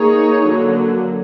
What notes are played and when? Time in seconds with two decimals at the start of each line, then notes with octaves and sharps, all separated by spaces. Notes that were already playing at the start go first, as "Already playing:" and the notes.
Already playing: A#3 D#4 G#4 C#5
0.45 D3 F#3 A#3